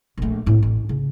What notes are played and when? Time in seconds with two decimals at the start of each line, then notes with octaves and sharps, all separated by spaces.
0.17 A#1 A3
0.46 A2 C4
0.63 A1
0.89 C#3